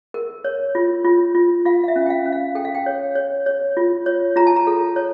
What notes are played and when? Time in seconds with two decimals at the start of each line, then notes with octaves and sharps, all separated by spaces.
0.14 A#4
0.44 C#5
0.75 F4
1.04 F4
1.35 F4
1.65 F4 F5
1.84 F5
1.88 E5
1.96 C#4
2.06 G5
2.10 F5
2.26 C#4
2.32 F5
2.55 A4 G5
2.65 F5
2.75 G5
2.86 C#5
3.15 C#5
3.46 C#5
3.77 F4
4.06 C#5
4.36 F4 A#5
4.47 A5
4.56 A#5
4.67 A4
4.96 C#5